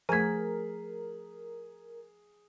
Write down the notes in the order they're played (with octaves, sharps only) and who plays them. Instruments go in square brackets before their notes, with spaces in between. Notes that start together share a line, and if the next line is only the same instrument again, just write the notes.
[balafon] F3 A3 [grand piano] G#4 B6 [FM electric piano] A#4 [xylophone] G#5 G#6